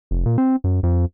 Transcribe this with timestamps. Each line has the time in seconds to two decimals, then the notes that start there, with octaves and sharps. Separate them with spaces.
0.11 F1
0.26 A#2
0.38 C4
0.64 F#2
0.83 F2